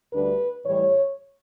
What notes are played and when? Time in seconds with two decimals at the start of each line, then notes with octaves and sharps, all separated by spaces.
0.14 D2 D3 G3 D4 B4
0.65 A2 E3 G3 C#5